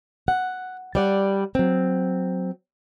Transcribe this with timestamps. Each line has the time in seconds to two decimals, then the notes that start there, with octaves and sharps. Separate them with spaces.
0.28 F#5
0.95 G3 D5 F#5
1.55 F#3 C4